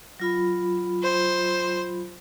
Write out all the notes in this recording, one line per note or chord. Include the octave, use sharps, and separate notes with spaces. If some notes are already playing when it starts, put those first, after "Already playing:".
F#3 F4 B5
C5